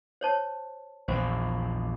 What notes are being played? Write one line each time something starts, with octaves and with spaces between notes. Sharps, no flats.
C5 C#5 A5
A#1 E2 A#2 C5